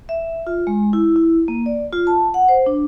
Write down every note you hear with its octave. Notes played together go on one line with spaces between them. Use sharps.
E5
F4
G#3
E4
E4
A#3
D5
F4
A5
F#5
C5
D4